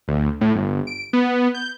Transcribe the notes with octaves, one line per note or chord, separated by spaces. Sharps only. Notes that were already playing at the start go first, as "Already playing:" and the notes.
D2
A2
G1
D7
B3
G6